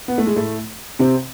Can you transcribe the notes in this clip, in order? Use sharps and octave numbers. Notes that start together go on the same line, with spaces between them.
B3
A3
G#3
A2 A3
C3 C4